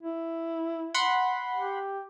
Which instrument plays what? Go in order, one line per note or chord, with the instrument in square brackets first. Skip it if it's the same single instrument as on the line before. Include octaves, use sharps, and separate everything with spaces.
[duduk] E4
[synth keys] F#5 B5 C6
[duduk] G4